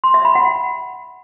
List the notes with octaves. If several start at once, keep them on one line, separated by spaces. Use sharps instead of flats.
C6
E5
B5
F#5